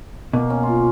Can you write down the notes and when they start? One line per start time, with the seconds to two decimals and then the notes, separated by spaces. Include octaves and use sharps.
0.33 B2 A#3
0.50 C#4
0.63 F4